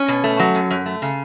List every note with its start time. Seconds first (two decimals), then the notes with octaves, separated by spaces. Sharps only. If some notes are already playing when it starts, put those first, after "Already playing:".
Already playing: C#4
0.08 B2
0.24 A3
0.39 F#3
0.55 F#2
0.70 F#2
0.86 A3
1.02 C#3